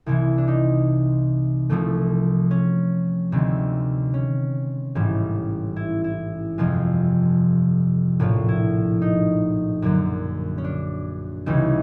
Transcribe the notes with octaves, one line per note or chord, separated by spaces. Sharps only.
C2 C3 E3 E4
D4
D#4
C2 C3 F3 A3
C#4
D2 C3 D#3 G#3 C4
C#4
A1 G#2 E3 G3
E4
E4
G1 F2 C3 F3 G#3 F4
A#1 A2 F3 F4
E4
D#4
F#2 D3 F#3 A#3
C#4
D4
C#2 C3 E3 G3 D#4